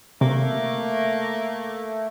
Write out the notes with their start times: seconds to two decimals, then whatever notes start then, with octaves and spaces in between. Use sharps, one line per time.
0.21 C3 A3 A#3